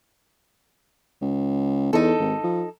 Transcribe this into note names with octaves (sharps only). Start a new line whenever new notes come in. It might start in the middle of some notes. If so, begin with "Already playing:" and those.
C#2
E2 D#4 A4
G#1
F3